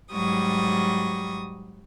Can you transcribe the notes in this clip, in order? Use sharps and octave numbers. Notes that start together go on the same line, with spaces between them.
G#2 F#3 G3 C#6 D#6